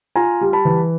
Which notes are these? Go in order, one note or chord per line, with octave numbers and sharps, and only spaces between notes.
F4 G#5 A#5
G3
A5 B5
E3